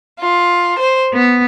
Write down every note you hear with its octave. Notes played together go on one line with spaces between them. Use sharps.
F4
C5
B3